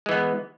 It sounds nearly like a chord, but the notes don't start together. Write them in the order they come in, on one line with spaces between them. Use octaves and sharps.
G#3 E3 B3